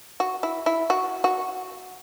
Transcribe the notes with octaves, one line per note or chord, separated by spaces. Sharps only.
F#4
E4
E4
F#4
F#4